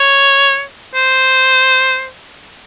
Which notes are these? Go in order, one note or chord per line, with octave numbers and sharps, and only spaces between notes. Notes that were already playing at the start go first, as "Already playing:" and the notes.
Already playing: C#5
C5